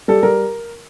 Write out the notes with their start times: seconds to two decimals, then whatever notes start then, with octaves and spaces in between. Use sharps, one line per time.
0.08 G3 A4
0.23 G3 A#4